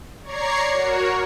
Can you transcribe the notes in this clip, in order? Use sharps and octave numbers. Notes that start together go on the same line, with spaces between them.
C#5 D5 A#5 C#6 G#6 C7
F#4 A#4 C#5